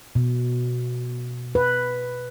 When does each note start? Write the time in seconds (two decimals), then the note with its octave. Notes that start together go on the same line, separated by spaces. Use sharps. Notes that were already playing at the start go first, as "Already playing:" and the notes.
0.15 B2
1.55 B4